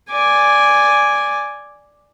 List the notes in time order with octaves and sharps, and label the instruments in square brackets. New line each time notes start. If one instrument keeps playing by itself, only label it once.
[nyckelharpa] D5 G#5